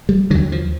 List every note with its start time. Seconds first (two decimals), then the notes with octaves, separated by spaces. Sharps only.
0.09 G3
0.30 D3 F#3
0.35 D#2
0.52 F3